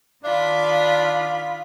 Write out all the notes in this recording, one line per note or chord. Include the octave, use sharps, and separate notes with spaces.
D#3 D4 F4 B5